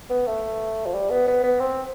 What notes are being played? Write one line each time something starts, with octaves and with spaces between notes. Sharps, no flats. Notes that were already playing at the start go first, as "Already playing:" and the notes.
B3
A3
F3
G3
B3
B3
B3
C4